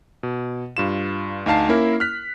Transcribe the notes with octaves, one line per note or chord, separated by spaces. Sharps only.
B2
G2 F4 E7
D2 D#4 F5 A5 C7
A#3 C#4 E4 A#4
F6 F#6 B6